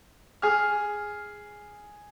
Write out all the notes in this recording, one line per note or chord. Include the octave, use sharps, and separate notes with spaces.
G#4 F6